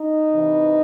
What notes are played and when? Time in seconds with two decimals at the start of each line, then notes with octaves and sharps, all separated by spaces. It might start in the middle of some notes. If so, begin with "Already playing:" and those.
Already playing: D#4
0.30 C3 E3